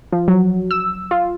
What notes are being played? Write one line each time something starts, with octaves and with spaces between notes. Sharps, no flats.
F3
F#3
E6
F4